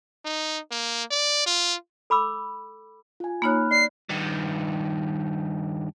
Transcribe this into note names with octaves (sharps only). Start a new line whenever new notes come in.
D#4
A#3
D5
F4
A4 B5 D6 E6
F4 G#5
A#3 D#4 C#5 B5 F6 F#6
D5 C7
G2 D#3